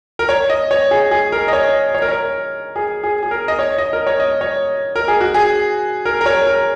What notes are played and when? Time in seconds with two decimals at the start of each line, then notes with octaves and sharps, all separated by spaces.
0.19 A#4
0.29 C#5
0.50 D#5
0.71 C#5
0.91 G#4
1.11 G#4
1.32 A#4
1.48 D#5
1.53 C#5
1.73 D#5
1.94 C#5
2.02 A#4
2.09 C#5
2.76 G#4
3.04 G#4
3.23 G#4
3.31 A#4
3.48 D#5
3.59 C#5
3.78 D#5
3.93 A#4
4.07 C#5
4.20 D#5
4.41 C#5
4.96 A#4
5.08 G#4
5.21 F#4
5.34 G#4
6.05 A#4
6.21 A#4
6.26 C#5
6.47 A#4